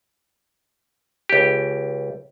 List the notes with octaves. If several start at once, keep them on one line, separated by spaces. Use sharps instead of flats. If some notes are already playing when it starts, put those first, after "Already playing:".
C#2 G4